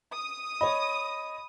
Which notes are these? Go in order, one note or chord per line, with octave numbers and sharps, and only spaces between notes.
D#6
C#5 D#5 B5